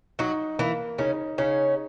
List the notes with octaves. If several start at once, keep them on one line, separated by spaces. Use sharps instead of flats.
F#3 D#4 F#4
E3 A#3 E4
C#3 C#4 D#4
C#3 C#4 D#4